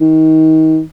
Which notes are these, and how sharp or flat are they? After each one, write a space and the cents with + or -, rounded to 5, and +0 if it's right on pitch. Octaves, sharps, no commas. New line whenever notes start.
D#3 +30